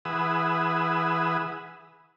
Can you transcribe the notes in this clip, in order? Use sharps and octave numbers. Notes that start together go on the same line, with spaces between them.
E3 G#4 B4 F#5 D#6 E6